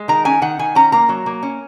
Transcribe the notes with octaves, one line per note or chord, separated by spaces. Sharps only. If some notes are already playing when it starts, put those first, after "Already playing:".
Already playing: G#3
D#3 A#5
C#4 G#5
D#3 F#5
D#3 G#5
C#4 A#5
A#3 A#5
F#3
A#3
C#4